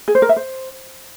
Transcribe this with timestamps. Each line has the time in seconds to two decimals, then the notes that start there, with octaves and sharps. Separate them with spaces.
0.08 G#4
0.15 C5
0.22 A#4
0.29 E5
0.36 C5